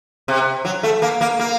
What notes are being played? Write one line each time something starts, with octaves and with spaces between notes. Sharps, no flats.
C3
F#3
A3
A#3
A#3
A#3